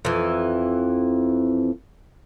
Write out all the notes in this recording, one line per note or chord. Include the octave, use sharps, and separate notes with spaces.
F2 E3